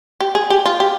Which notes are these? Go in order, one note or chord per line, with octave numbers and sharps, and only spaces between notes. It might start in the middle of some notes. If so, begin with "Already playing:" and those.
G4
G#4
G4
F4
G4